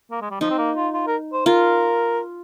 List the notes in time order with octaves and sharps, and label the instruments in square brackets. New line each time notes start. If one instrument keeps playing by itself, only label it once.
[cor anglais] A#3
G#3
G3
[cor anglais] F3 [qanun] D#4
[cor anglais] C4
A#3
F4
F4
A#4
C5
[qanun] F4 [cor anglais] A#4